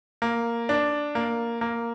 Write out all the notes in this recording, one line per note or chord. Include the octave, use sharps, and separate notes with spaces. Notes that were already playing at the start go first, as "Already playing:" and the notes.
A#3
D4
A#3
A#3